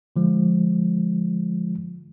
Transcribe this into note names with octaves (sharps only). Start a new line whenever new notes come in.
D3 F3 G#3